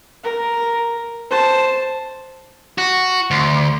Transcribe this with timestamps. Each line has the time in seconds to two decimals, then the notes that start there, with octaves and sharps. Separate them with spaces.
0.24 A#4
1.30 C5 A5
2.78 F#4
3.31 D2